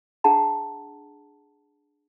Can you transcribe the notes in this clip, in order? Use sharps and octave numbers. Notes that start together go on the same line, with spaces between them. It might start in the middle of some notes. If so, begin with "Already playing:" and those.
D4 G#4 F#5 A5 A#5